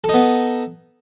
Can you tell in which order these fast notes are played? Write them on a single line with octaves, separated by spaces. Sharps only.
A4 D#4 B3